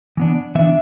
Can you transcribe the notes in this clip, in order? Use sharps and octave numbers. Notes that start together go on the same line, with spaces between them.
E3 B3 D4
E3 B3 D4 E5